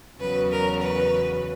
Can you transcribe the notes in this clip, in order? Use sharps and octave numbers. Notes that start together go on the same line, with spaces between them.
E2 C#3 F#3 B4
A#4
B4